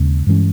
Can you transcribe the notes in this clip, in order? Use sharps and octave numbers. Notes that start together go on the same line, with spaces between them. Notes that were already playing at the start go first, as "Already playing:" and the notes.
Already playing: D#2 C#3 G#3
G2 E3 G#3 C#4